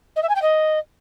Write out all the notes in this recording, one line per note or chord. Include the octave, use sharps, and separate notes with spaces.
D#5
E5
G#5
G5
D#5